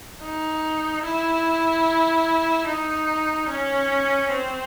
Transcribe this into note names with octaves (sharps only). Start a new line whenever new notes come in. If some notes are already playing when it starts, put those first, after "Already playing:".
D#4
E4
D#4
C#4
C4